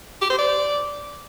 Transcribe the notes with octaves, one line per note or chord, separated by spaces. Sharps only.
G4
C5
D5